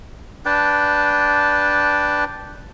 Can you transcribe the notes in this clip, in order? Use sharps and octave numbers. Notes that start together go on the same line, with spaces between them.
D4 B4 G5 A5